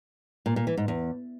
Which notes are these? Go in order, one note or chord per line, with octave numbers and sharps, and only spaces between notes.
A#2
A#2
E3
G#2
E2